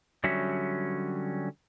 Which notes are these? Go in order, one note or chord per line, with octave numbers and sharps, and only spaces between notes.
D3 F#3 G3 C#4 F#4 E5